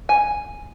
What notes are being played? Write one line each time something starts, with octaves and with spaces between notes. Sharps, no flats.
G#5